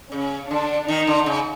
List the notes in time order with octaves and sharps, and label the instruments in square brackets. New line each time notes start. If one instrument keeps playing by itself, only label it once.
[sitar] C#3 [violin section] C#4
[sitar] D3 [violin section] D4
[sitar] D#3 [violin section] D#4
[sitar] D3
C#3